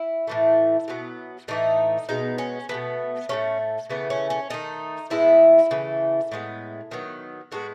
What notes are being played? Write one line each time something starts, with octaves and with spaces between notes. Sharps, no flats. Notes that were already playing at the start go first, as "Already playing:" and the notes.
Already playing: E4
A2 E3 A3
B2 F#3 B3
A2 E3 A3 D#4
B2 G#3 B3 D#4
C#4
B2 F#3 A3 B3
A2 F#3 A3 C#4
C#3 E3 A3 B3
C#4
C#4
D#3 A3 D#4
A2 G#3 B3 E4
C#3 E3 A3
A2 G#3 B3
D#3 F#3 B3
A2 G#3 B3 F#4